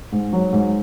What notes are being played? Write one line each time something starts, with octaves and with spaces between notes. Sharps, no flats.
G#2
F#3
G#2